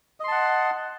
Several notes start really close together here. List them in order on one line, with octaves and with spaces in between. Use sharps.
D#5 C6 A5 F#5